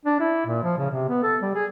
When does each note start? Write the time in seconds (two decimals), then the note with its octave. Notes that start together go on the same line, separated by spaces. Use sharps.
0.05 D4
0.20 E4
0.47 A#2
0.63 F3
0.78 C#3
0.91 C3
1.09 B3
1.23 A4
1.42 G3
1.55 G#4